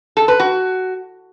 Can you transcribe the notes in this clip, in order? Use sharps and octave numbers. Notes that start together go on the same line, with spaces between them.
A4
B4
F#4